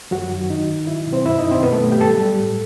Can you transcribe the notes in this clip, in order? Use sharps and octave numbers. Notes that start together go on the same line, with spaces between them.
F#2 F#3 F#4
D#3
D#3 D#4
D#3
F#3 E4
B2
C4 C5
F#2 E4 E5
D#4 D#5
D#3
C4 C5
B2 B3 B4
A3 A4
F#3
G4 G5
G3 A4 A5
G3
A2